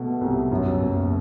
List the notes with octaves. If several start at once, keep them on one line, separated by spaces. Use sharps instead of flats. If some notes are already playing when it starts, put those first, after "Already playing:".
Already playing: B2 A3
C2
F#2
F#1